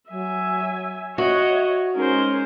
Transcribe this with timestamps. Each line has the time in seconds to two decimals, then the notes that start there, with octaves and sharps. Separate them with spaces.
0.11 F#3 E5 G#5
1.18 F#4 C#5 D#5 E5 F#5
1.95 G#3 C#4 D#4 A#4 C5